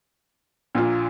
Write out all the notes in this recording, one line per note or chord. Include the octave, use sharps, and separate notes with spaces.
A#1 A#2 A#3 F4